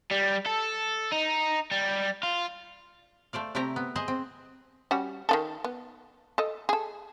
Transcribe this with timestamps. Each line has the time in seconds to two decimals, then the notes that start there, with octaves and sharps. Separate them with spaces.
0.11 G3
0.46 A4
1.12 D#4
1.72 G3
2.23 F4
3.33 A3 C5 D5 F5
3.55 C3 A3 C4 E4 G4 A#5
3.76 B3
3.96 G#4 C5 D#5
4.08 C4
4.91 G3 C#4 F#4
5.29 D#3 E3 A4
5.64 B3
6.38 A4 D#5
6.69 G#4 A4